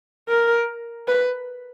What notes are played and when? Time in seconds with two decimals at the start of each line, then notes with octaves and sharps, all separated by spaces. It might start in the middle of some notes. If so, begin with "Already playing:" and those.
0.29 A#4
1.08 B4